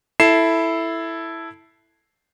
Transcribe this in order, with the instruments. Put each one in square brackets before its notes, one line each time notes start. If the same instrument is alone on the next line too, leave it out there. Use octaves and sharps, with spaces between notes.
[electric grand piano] E4 A4 C7 E7